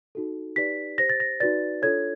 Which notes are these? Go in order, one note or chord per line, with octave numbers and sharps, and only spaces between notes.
D#4 F#4 A4
D#4 G4 B4 D5 B6
G4 C5 A#6
A6
A#6
D#4 F#4 B4 D5 A6
D4 F4 A4 C#5 G#6